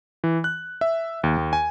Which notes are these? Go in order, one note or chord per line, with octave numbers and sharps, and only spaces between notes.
E3
F#6
E5
D#2
D#2
G#5